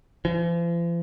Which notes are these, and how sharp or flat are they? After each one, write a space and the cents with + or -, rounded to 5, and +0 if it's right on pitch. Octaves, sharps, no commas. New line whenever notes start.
F3 -45